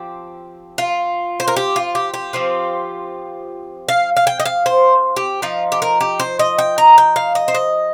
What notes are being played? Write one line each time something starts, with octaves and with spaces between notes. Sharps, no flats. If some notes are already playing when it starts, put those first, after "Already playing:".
Already playing: F3 C4 G4
F4
C5
A#4
G4
F4
G4
G4
F3 C4 F4
F5
F5
G5
D#5
F5
C5
G4
F3 D#4 F4
G4
A#4
G4
C5
D#5
G5
A#5
G5
F5
D#5
C5
D#5